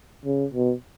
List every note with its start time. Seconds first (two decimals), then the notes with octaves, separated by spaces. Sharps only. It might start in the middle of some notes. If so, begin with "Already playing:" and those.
0.25 C#3
0.54 B2